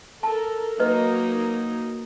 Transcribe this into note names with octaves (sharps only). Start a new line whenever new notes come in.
A4 A#4 A5
F#3 A#3 D#4 B4 D#5